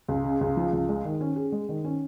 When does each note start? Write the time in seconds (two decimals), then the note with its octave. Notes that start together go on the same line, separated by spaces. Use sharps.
0.08 C#2
0.24 C#3
0.41 C#2
0.57 F3
0.73 C#2
0.89 G#3
1.04 D#3
1.21 C#4
1.36 G#4
1.52 G#3
1.69 D#3
1.84 C#4